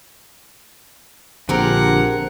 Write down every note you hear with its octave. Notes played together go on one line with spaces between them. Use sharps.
A#1 D3 C4 G4 G#4 A#4 F#5 A#5